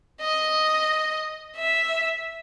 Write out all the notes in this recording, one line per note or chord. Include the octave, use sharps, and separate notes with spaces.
D#5
E5